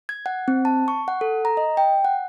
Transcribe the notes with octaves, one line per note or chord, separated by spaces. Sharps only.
G#6
F#5
C4
A5
C#6
F#5
A4
A#5
D#5
G5
F#5